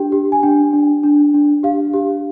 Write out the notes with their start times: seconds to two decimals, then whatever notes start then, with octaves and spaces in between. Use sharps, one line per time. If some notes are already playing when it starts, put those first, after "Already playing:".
Already playing: D4 G4 G5
0.12 G4
0.32 G#5
0.43 D4 G5
0.73 D4
1.03 D4
1.34 D4
1.63 G4 F5
1.93 G4